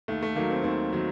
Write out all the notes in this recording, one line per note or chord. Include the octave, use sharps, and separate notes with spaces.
D#2 A3
A3
D#3 F#3 A#3
C4
D#2 C4
D#3 F#3